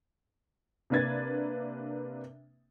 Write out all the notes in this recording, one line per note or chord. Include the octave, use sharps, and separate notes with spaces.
C3 A#3 D4 B4 G#6 A6